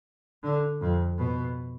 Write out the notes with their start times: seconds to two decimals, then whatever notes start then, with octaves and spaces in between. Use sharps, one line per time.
0.43 D3
0.81 F2
1.18 B2